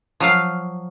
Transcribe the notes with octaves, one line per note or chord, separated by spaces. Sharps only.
F3 F#3 F5